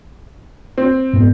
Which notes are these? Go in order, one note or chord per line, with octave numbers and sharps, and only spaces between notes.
C4
G#2 B3